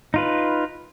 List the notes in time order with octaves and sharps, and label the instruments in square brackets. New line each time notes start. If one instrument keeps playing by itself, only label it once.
[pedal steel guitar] D#4 F4 B4